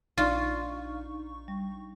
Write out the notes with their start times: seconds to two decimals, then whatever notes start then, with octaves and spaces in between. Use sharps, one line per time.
0.18 A#1 D4 D#4 F4 D5 C#6
1.48 G3